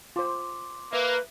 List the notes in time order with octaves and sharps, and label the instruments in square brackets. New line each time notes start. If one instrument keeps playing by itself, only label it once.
[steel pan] F4 C5 [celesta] C6 D6
[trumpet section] A#3 [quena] B4 [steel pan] E5